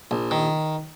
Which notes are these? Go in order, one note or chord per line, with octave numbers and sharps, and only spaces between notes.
A#1
D#3